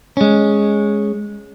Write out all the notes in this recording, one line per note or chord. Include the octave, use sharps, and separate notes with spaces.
G#3 C#4